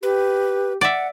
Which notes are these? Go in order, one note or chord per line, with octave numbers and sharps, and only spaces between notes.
G4 B4
D5 E5 F#5